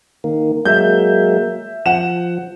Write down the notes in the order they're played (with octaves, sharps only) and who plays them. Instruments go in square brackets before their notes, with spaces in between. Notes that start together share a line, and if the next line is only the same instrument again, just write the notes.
[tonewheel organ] D#3 A#3
[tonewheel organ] F#3 G#3 A#3 [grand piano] E5 G6
[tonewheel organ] F3 [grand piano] F#5 E7